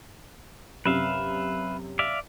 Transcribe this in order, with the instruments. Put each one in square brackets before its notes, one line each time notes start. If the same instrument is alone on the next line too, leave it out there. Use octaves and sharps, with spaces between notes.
[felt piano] F#2 C3 [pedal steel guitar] B4 E5 F5
[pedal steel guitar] D5 E5 F5